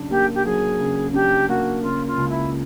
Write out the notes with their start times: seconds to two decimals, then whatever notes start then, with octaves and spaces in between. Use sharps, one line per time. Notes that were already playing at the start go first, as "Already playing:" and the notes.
Already playing: C#3 F#3 D4
0.10 A#3 G4
0.35 G4
0.45 F#3 G#4
0.80 C#3
1.14 D4 G4
1.48 A#3 F#4
1.82 C#3 F4
2.06 F4
2.17 C#2
2.29 E4